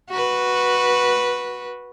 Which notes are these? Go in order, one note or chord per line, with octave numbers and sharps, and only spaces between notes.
F#4 B4